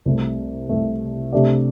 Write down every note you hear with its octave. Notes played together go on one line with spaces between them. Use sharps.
C2 C3 A3
C2 C3 A3
C3 A3 D4 G4 D5